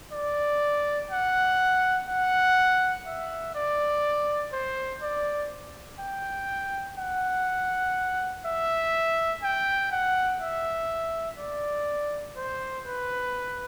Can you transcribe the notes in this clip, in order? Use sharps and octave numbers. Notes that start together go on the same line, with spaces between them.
D5
F#5
F#5
E5
D5
C5
D5
G5
F#5
E5
G5
F#5
E5
D5
C5
B4